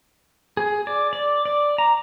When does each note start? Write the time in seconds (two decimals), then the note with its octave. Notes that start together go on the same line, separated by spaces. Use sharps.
0.57 G#4
0.87 D5
1.13 D5
1.45 D5
1.78 A#5